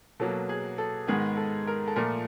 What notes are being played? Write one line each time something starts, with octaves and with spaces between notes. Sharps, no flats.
B2 F#3 A#3 A4
G#4
A4
G#2 D#3 G#3 B3 G#4
A4
A#4
A4
A#2 F3 A3 A#4